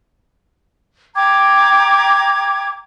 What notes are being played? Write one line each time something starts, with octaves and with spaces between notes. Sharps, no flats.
G5 A#5 D6 G#6